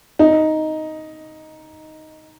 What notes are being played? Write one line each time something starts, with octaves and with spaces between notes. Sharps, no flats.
D#4